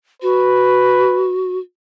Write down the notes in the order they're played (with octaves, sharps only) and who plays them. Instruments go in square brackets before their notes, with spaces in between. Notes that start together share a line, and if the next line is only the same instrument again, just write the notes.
[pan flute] F#4 [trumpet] B4